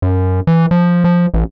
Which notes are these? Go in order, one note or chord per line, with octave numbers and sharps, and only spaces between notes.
F#2
E3
F3
F3
A1